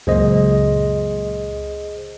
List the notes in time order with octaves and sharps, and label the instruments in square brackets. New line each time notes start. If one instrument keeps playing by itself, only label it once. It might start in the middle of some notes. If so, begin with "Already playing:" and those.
[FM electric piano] C#2 F#2 A#2 [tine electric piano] G#4 C5 D#5